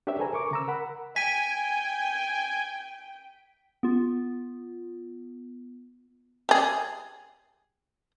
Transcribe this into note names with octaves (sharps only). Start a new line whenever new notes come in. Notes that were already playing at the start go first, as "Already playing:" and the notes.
D4 G4 A#4 C5 C#5 E5
G#4 A4 B4 C5 G#5 A#5
A#4 C#6 D6
C#3 A#5 E6
A#4 F#5 B5
G5 G#5 B6 D#7
B3 F4
G4 G#4